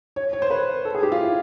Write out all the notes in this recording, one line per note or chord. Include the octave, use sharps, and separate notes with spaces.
C#5
C#5
C5
B4
A4
G#4
G4
F4
E4